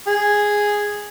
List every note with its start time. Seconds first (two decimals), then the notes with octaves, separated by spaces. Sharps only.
0.07 G#4